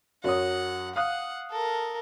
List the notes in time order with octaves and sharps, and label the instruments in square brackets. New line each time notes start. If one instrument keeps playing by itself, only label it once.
[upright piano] F#2 F#3 D#6 [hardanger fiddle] F#5
[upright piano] F5 D#6 F#6 [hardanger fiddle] F#5
[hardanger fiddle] A4 A#4